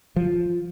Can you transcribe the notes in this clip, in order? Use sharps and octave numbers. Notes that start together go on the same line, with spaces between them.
F3